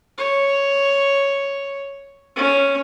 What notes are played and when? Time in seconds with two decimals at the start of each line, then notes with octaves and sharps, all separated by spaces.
0.18 C#5
2.36 C#4